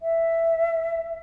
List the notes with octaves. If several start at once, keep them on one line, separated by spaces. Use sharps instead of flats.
E5